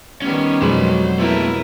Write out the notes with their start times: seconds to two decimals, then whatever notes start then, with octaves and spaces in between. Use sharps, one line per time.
0.22 D#3 G3 B3 C#4
0.62 F2 B2 F#3 G#3 C5 B5
1.19 A3 B3 E4 A#4 B4